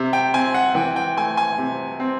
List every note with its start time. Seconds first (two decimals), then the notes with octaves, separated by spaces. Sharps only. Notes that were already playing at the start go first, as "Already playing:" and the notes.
Already playing: C3
0.13 G5
0.34 C4 G#5
0.54 F#5
0.75 E3 G5
0.96 G5
1.17 A3 G#5
1.37 G#5
1.58 C3
2.00 C4